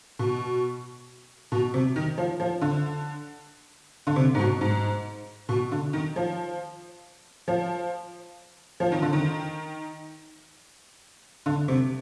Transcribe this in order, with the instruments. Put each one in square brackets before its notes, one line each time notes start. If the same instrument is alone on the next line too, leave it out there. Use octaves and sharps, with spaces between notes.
[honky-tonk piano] B2
B2
C3
D#3
F3
F3
D3
D3
C3
G#2
B2
G#2
B2
D3
D#3
F3
F3
F3
D#3
D3
D#3
D3
C3